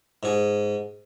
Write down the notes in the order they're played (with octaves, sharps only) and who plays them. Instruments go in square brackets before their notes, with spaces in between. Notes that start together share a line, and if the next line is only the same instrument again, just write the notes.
[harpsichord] G#2 G#4